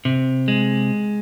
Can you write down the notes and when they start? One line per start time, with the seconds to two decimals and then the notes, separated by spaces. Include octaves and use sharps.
0.05 C3
0.48 G#3